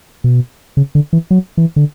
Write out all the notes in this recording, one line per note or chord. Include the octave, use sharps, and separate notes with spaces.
B2
C#3
D3
E3
F#3
E3
D3